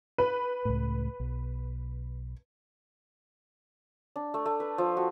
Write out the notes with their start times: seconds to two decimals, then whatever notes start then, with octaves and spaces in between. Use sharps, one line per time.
0.18 B4
0.65 C#2 A2
1.20 B1
4.16 D4
4.34 A3
4.45 A3
4.60 B4
4.78 F3
4.97 F#4